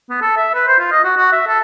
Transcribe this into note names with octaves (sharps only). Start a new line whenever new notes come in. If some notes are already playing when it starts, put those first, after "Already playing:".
B3
A4
E5
B4
C5
F4
D#5
F#4
F#4
E5
A4